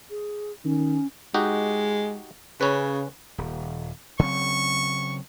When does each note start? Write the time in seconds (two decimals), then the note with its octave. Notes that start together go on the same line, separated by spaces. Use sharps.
0.10 G#4
0.64 D#3 C#4
1.34 G#3 D#4 F#4 G4
2.61 C#3 C#4 B4
3.38 D#1
4.19 C#3 F#3 C4 C#6